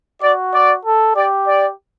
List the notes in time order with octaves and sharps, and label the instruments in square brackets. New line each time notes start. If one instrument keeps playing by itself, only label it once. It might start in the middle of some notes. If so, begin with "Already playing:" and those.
[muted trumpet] F#4 [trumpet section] D5
[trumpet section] D5
[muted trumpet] A4
[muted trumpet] G4 [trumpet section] D5
[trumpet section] D5